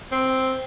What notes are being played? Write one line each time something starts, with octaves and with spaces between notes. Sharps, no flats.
C4